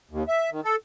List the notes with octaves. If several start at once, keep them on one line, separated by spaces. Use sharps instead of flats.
D#2
E5
D#3
A4